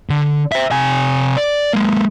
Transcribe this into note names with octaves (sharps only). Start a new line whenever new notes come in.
D3
C5 E5
C3 G#5
D5
G#3 A#3